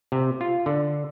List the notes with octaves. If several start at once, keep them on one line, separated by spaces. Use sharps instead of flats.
C3
F4
D3